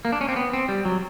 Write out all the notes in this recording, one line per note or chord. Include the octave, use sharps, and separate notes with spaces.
A#3
D4
C#4
C4
B3
C4
G3
F#3